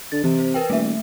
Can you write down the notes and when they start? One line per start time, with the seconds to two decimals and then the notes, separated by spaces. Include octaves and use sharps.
0.12 D3 A6
0.24 C3 E3
0.39 C5
0.54 A#4 B4 G5
0.70 D#1 A3 E5